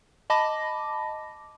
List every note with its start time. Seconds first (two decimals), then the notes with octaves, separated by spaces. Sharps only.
0.30 D#5 A5 B5 D6 A#6